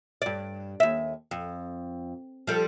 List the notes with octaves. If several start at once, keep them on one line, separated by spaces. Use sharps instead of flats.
G2 D5
D#2 E5
F2
F3 G3 A4